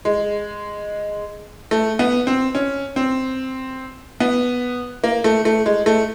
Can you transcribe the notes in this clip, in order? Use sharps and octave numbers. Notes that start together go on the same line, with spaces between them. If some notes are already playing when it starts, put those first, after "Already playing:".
G#3
A3
B3
C4
C#4
C4
B3
A#3
A3
A3
G#3
A3